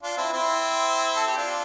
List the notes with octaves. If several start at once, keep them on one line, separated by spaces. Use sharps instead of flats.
D4 F4
C4 E4
C4 E4
A4
G4
D4 F4